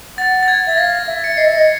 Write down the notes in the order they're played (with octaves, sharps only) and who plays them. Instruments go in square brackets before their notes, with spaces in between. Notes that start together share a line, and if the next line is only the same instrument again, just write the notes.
[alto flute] F#5 [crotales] A6
[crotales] A6
G#6
[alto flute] E5 [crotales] A6
[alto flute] F5 [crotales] A#6
[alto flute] E5
[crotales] C#7
[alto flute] D#5 [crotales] C7
[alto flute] E5
D#5